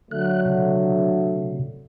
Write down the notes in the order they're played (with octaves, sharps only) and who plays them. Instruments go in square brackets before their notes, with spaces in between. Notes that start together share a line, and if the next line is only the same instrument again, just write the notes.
[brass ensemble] D3 F#3 A3 [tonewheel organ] F#6
[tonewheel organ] C3